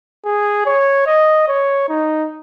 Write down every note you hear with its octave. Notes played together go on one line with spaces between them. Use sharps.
G#4
C#5
D#5
C#5
D#4